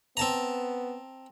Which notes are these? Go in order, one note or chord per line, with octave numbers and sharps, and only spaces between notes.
B3 C4 A5 A#5